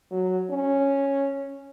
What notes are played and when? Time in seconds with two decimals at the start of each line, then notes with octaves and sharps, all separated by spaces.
0.12 F#3
0.51 C#4